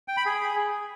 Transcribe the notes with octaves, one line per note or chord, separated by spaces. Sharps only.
G5
B5
G#4